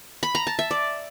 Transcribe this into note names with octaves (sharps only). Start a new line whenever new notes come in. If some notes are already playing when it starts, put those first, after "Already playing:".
B5
A#5
A5
E5
D5